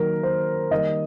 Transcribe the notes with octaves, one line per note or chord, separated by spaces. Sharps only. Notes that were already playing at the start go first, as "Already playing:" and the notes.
Already playing: D#3 F#3 A#3 A#4
C5
D#3 G3 A#3 D#5